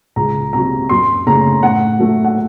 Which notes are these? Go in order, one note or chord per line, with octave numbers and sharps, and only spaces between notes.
C#2 A#5
C3 F#3 A#5
F#2 C6
C#3 A3 A#5
A2 F#5
F#3 A3
F#5